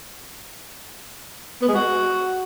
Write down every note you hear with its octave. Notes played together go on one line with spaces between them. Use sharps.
B3
G#3
F#4